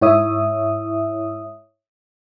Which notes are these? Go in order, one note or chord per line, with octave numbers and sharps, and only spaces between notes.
G#2 E4 C#5 E5 D#6